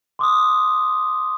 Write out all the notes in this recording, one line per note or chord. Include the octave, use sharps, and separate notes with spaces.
C6 D6 D#6